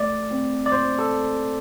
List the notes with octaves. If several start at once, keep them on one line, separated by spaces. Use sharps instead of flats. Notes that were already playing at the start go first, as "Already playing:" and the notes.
Already playing: A3 D5
C4
D5
A#2 C5
A4
A#2